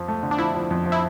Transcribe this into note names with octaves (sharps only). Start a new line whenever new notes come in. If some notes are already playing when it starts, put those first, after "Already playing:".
Already playing: F2 F3
A3
D3
D4
F3 E4
F3
F2
F3
E4